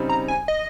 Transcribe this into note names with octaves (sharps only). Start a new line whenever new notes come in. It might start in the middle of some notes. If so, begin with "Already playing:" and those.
Already playing: C#3 G3 C4 D#4
A#5
G#5
D#5